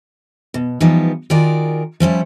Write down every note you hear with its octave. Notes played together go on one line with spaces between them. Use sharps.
B2
E3 F3 G3 B3 D#4
D#3 F4 F#4 G#4 A#4 D5
F3 G3 C#4 E4